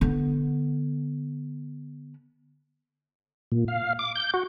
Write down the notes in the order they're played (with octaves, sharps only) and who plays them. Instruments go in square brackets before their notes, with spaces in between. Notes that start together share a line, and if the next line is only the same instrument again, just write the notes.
[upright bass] D3 B3
[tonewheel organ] A#2
F5
D6
G6
F#4